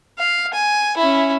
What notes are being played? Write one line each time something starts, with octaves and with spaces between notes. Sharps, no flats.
F5
G#5
C#4 E4